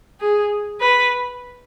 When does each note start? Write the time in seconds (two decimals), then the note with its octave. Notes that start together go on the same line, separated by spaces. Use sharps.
0.20 G#4
0.81 B4